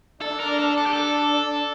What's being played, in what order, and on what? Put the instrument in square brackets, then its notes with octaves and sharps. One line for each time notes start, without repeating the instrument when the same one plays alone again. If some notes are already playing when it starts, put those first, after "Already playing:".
[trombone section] D4 [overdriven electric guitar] A4
[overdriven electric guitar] A#4
A4
A4
G4
A4
[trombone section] D4